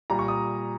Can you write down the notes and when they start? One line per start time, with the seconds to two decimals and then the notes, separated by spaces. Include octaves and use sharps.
0.10 A#2 G3 A#5
0.19 C#6
0.28 D#6